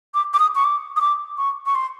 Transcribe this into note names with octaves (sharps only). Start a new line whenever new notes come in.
D6
D6
D#6
C#6
D6
D#6
D6
C#6
C#6
C6